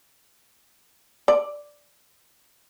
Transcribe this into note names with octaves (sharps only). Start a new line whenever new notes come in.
D5